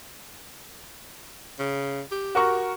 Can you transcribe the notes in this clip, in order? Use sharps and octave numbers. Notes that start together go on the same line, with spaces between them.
C#3
G4
F#4 A#4 C#6